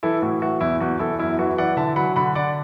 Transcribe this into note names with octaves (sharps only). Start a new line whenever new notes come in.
E3 E4 A4
A2 F#4
E3 F#4
E2 E4
E2 F#4
E2 E4 A4
F#2 E4
E3 F#4
E3 D5 F#5
D3 E5 A5
F#3 F#5 B5
D3 F#5 B5
D3 D5 F#5